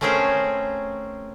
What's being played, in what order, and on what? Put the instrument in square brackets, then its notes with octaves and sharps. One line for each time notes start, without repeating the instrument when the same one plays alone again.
[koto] A3 C4 C#4 G#4 A#4 C5